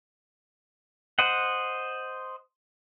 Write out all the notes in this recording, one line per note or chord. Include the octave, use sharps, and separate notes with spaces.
C5 D#5 F#5